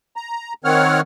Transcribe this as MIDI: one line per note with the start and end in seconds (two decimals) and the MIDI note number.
0.16 0.53 82
0.64 1.01 51
0.64 1.01 60
0.64 1.01 73
0.64 1.01 78
0.64 1.01 89